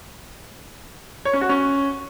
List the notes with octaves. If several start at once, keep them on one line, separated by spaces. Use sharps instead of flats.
C#5
C#4
F#4
C#4